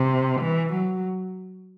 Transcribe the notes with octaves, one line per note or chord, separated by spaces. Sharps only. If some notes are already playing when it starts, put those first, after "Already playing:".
Already playing: C3
E3
F#3